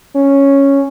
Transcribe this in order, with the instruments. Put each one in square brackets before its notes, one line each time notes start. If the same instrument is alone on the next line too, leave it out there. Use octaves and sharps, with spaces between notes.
[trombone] C#4